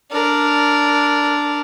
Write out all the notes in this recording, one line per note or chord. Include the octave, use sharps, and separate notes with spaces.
D4 A#4